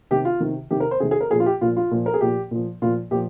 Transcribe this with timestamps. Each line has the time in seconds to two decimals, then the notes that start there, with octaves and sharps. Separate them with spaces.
0.11 C3 D#3 G4
0.25 F4
0.40 C3 D#3
0.71 C3 D#3 G4
0.80 A#4
0.91 C5
1.00 C3 G#4
1.03 D#3
1.11 G#4
1.21 A#4
1.30 A#2 F3 G#4
1.40 F4
1.46 G4
1.61 A#2 F3 F4
1.76 F4
1.91 A#2 F3
2.06 A#4
2.14 G#4
2.21 A#2 F3 G4
2.51 A#2 F3
2.82 A#2 F3 F4
3.11 A#2 F3 G4